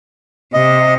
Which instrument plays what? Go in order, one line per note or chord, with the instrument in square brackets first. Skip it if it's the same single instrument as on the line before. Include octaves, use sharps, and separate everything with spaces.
[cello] C3 [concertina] D#5